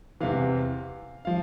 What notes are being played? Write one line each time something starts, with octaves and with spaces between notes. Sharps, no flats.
E2 C3 E3 F5
F3 F5